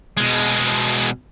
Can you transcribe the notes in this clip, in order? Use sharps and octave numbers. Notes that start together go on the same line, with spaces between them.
B2 G#3